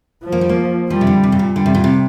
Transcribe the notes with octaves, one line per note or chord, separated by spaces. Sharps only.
F3
A#3
G3
A#3
F3 G3
C3
D3
C3
G2
A#2
D3 G3
C3
A#2
C3